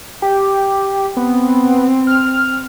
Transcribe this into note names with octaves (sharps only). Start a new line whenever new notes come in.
G4
B3 C4
F6